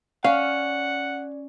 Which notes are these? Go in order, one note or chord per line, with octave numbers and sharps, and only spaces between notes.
C#4 D5 F5 F#5